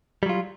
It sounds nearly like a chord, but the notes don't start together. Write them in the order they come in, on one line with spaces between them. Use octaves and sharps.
G3 F#3 F4